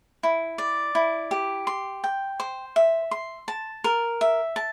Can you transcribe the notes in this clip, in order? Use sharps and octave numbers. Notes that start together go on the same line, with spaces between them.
E4
D5
E4
G4
C6
G5
C5
E5
C6
A5
A#4
E5
A5